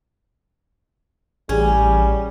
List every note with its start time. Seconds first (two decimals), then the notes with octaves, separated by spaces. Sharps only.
1.49 A1 G3 C#4 G#4